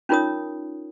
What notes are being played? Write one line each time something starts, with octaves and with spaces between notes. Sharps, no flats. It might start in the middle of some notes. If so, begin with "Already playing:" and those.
C#4 D#4 F4 A#4 C#5 D#6